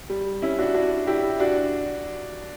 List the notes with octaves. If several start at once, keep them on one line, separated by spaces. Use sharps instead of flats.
G3
C#4 E4
D4 F#4
D4 F#4
E4 G4
D4 F#4